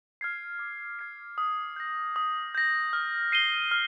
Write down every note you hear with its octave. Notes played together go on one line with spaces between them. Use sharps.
F6 G#6 C7
D6
F6 G#6 C7
D#6
G6 A#6
D#6
G6 A#6
F6
C7 D#7 G7
F6